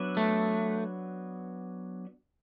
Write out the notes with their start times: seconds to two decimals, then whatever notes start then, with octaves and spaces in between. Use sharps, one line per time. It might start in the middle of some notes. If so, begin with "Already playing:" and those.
Already playing: F#3 B3 D4 B4 E5
0.17 A3